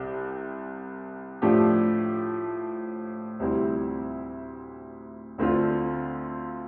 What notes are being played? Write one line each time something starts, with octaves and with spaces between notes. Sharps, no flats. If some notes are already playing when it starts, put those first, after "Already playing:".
Already playing: C2 C3 C4
A2 F3 A3 D4 G4
D2 C3 G3 C4 E4
D2 D3 A3 C4 F4